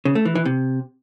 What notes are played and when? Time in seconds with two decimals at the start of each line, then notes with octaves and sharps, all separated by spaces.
0.05 C#3
0.15 A3
0.25 E3
0.35 E3
0.45 C3